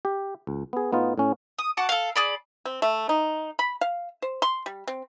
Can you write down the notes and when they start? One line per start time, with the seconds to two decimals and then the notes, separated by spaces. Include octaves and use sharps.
0.05 G4
0.47 C#2
0.73 B3 G#4
0.92 A2 B3 D#4 F4
1.18 A2 C#4
1.59 D#6
1.77 F#4 F#5 A5 D6
1.89 A4 F5
2.16 G#4 D5 B5
2.65 C4
2.82 A3
3.09 D#4
3.59 B5
3.81 F5
4.22 C5
4.42 C6
4.66 G3
4.87 C4